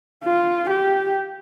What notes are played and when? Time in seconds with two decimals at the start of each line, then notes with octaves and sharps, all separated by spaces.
0.24 F4
0.70 G4